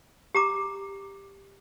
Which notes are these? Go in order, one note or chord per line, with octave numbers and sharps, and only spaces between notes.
G4 A#5 D6